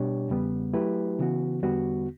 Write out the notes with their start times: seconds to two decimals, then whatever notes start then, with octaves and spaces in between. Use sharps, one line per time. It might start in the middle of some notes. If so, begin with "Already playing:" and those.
Already playing: B2 G3 D4 G4 C#5
0.29 E2 C#3 G3 B3
0.73 F#3 A3 E4 G4 B4
1.19 C#3 E3 B3 F#4
1.63 E2 D3 G3 B3 F#4